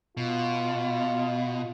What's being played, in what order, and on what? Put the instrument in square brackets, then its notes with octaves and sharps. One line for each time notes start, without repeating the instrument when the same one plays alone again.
[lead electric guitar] B2 [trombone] F4